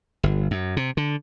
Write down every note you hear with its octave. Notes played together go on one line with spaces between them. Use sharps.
G1
F#2
C3
D3